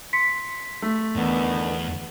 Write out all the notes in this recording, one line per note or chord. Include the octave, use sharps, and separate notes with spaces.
C6 B6 C#7
A3
E2 D3 D#3 B3